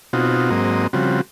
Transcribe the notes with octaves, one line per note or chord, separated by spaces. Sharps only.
B2 C4 D#4 F4 F#4
G#2 F#3 A#3 C4 D#5
C#3 F3 G3 C4 F#4